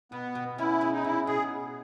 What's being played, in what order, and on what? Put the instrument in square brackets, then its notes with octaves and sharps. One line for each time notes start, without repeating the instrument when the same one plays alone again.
[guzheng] B2 [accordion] B3
[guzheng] B2
[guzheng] C#4 [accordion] E4
[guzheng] G#3
[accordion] D#4
[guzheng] B2 [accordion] E4
[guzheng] B2 [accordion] G#4